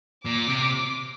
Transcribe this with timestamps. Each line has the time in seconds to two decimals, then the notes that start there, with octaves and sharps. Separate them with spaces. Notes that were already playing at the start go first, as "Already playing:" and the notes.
0.25 A#2 D6
0.48 C3